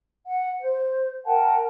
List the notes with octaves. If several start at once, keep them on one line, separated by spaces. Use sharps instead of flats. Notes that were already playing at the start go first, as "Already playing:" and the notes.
F#5
C5
A#4 F#5 G5 A5